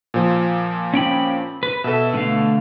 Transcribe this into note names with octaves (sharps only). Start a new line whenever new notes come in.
A#2 F3
C#4 G5 B5
B4
B2 A4 E5
D3 A3 F5